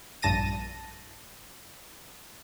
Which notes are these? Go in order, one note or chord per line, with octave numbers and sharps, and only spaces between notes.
A#1 G2 A5 A#6 D#7